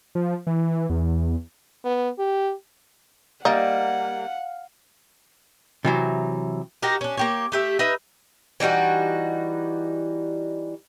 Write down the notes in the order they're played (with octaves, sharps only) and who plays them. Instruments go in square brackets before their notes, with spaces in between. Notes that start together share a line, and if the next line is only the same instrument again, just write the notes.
[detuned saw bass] F3
E3
E2
[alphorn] B3
G4
[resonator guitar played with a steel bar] G3 A#3 [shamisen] D#4 [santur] F5 [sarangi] F#5
[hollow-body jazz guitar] C3 E3 F#3
[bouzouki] D#4 F#4 G4 A#4
C#4 D4
A#3 G4 C#5
A3 G4 E5
D#4 B4 E5
E3 G3 D#4 F#4